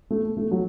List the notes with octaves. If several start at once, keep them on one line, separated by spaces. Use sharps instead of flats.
A3
A3
F#3